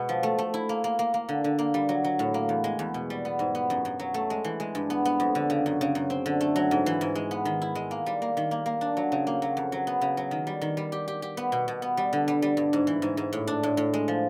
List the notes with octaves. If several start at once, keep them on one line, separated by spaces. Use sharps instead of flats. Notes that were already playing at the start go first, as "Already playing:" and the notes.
Already playing: B2 G#3 B3
F3
A3
A3
E4
A#3
A#3
A#3
A#3
D3
D3
A#3
G3
F#3
F#3
A2
A#3
E2
G#3
E2
B2
G3
B3
G#2
B3
F#2
F#2
F#3
A3
G#3
E3
G#3
G2
B3
B3
F2
D3
C#3
F#2
C#3
F#2
C4
D3
A3
F#3
G#2
E3
G#2
G#3
B3
D#3
E4
G#3
A#3
G3
A#3
D#3
A#3
A#3
D4
F#3
C#3
A#3
F#3
F2
F#3
B3
C#3
F#3
D#3
G3
D#3
G3
G4
G4
G4
B3
B2
B2
B3
G3
D3
G3
G3
G2
G#2
E3
G#2
G#2
A2
D4
A2
A2
G#3
F3